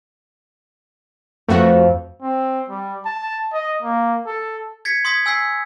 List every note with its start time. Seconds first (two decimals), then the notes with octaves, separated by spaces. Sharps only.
1.48 F2 A3 F#4
2.22 C4
2.69 G3
3.05 A5
3.53 D#5
3.82 A#3
4.26 A4
4.85 G#6 A6 B6 C#7
5.05 C6 D#6 G#6 B6
5.26 G#5 E6 G6 B6 C7